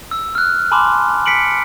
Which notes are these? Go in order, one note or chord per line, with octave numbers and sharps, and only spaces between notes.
E6
F6 F#6
G#5 A5 B5 C6 D6
B6 C#7 D7 F#7